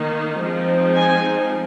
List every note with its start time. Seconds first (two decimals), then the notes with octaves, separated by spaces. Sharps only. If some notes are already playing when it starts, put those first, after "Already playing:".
Already playing: D#3 A#3 D#4
0.38 F3 G#3 C4 D#4
0.95 G#5